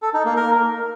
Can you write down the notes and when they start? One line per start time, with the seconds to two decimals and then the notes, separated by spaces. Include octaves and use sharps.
0.02 A4
0.14 D#4
0.25 A#3
0.36 A#4